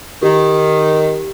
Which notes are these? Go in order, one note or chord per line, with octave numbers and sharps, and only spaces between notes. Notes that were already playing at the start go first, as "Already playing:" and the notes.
D#3 G4